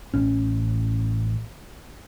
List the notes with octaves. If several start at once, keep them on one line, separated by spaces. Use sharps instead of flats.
A1 C#4